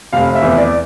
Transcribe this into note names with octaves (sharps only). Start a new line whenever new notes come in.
F1 F5
E5
E2
D5